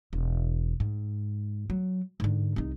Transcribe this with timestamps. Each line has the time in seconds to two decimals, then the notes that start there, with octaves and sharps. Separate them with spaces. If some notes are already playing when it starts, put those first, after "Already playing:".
0.13 E1
0.80 G#2
1.70 F#3
2.20 G#2 D3
2.56 C2 D#4